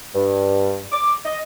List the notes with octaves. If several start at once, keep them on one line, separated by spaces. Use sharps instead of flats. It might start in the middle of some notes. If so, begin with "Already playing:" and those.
G2
D6
D#5